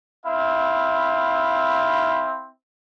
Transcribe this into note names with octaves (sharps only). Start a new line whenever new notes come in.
C4 E4 F5